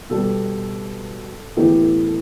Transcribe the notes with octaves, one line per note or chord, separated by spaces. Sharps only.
B2 G3 B3 A4
A2 E3 B3 G4
A4
A4